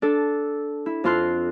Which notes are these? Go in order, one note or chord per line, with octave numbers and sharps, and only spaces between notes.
D4 A4
E4
F2 C4 F4 C6 F#6